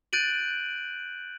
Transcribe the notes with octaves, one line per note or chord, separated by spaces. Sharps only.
F#6 G6 A6 D7 D#7 F#7